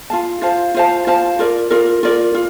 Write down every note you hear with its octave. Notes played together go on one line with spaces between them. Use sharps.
F4 C5 F5 A5
F4 C5 F5 A5
F4 C5 F5 A5
F4 C5 F5 A5
F4 A#4 D5
F4 A#4 D5
F4 A#4 D5
F4